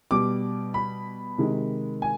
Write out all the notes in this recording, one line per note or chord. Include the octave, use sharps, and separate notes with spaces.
B2 G3 D6
B5
C3 D#3 G#3
G#5